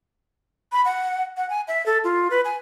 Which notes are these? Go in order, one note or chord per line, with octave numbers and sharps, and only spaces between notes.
B5
F#5
F#5
G#5
E5
A4
F4
B4
G#5